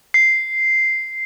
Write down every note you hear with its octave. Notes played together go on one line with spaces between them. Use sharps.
C7